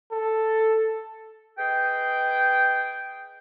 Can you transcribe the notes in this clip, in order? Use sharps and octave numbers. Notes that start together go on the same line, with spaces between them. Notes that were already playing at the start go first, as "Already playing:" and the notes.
A4
G#4 B4 D#5 G5